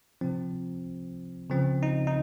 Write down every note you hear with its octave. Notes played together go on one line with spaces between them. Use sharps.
C3 F3 C4
C#3 F3 C4
D#4
D#4